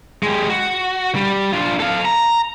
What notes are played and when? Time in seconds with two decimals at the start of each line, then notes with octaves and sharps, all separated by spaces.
0.23 G#3 G4
0.50 F#4
1.15 G3
1.53 D4 F4
1.80 A4 F5
2.05 A#5